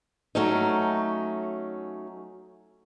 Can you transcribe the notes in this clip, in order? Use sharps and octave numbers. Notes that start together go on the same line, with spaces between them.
F#3 A3 C#4 D#4